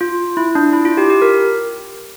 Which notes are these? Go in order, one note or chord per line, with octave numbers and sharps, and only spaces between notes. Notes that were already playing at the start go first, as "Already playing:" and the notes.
F4
E4
D4
E4
F4
G4
G4
A#4